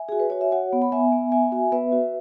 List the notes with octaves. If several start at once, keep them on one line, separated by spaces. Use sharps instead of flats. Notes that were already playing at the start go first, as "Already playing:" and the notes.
Already playing: E5 G#5
F#4 G#4
B4
F#4 C#5
E5
F#4 C#5 F#5
B3
B5
B3 E5 G#5
B3
B3 E5 G#5
F#4
B3 B4 E5
F#4